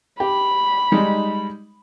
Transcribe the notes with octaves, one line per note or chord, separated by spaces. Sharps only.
G4 B5
G3 G#3 D#4